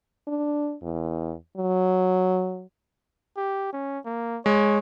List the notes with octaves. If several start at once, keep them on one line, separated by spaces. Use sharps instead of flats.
D4
E2
F#3
G4
C#4
A#3
G#3 C#5